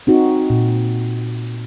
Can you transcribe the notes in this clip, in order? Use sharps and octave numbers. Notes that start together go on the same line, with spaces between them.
C4 D#4 F#4
A#2